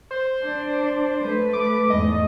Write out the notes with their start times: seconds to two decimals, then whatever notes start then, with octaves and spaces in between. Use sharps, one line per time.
0.11 C5
0.42 D4
1.23 A3 B4
1.53 D6
1.90 E2 G#2 A3 D#5